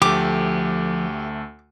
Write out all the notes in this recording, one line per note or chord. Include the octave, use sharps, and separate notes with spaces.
D2 F3 A3 G4 D6